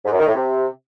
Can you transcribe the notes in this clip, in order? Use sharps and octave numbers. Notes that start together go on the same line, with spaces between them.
G#2
F#2
D#3
A2
C3